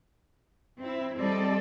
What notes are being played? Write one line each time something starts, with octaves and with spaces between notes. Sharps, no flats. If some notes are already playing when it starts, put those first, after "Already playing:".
C4 E4
G3 C4 A4 D5 D#5